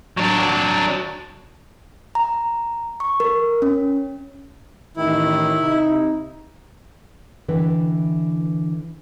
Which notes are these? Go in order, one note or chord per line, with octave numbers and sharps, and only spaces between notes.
F#3 D4
A#5
C#6
A#4
C#4
A1 D#3 E4
C3 D#4
D3 E3 B4 G5